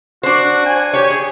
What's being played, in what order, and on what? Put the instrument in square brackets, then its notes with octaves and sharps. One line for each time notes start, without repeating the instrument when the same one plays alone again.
[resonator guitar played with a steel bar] D4 C5 [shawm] F#4
[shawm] G#5
[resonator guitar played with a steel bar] G4 C#5
G#4